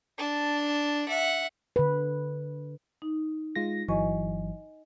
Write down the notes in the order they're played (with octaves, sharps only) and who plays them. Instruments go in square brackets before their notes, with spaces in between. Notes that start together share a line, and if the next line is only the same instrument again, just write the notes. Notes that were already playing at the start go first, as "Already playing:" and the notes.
[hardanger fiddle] D4 A5
E5 F#5
[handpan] D3 B4
[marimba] D#4
[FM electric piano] G#3 F4 A#6
[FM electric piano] G1 E3 F#3 [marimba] D#5 G#5 C#6